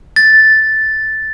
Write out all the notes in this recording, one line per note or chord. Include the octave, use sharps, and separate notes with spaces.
A6